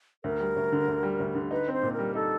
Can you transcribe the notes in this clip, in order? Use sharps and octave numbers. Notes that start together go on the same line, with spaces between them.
D2 A#4
G3
D2
D3
D2
G3
D2
D3
D#4 B4
C4 C5
A#2
A#4
G3
D#4 A4